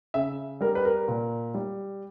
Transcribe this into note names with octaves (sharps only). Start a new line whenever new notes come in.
C#3 E5
G3 A#4
B4
A#4
A#2
G3